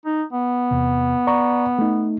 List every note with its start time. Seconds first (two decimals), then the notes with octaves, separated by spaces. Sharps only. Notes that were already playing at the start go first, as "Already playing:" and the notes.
0.06 D#4
0.33 B3
0.71 E2 C3
1.27 D5 A#5 C#6
1.79 A3 D#4